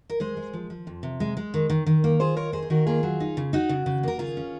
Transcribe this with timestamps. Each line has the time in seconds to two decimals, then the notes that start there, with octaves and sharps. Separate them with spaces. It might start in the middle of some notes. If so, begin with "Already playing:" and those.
0.10 A#4
0.20 G#3 G#4 C5
0.37 G#3
0.53 F3
0.70 F3
0.87 F2
1.03 C3
1.20 G#3
1.37 G#3
1.54 D#3
1.70 D#3
1.86 D#3
2.04 A#3
2.20 F4 G#4 C5
2.36 D#3 A#4 C#5
2.52 A#3 G#4 C5
2.62 C5
2.70 D#3 F#4 A#4
2.87 A#3 F4 G#4
3.03 F#3
3.20 D#4
3.37 C#3
3.53 D#4 F#4
3.69 C#3
3.86 C#3
4.03 A#3 A#4
4.19 C#3 F4 G#4
4.37 C#4